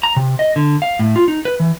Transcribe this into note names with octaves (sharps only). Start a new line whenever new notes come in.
A#5
C3
D#5
D3
F5
A2
F4
D#4
B4
E3